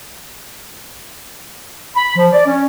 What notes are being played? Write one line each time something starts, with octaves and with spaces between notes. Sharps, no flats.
B5
F3
D5
C#4